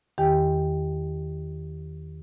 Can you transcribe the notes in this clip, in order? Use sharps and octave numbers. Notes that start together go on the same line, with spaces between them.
E2 D#3 G4 G5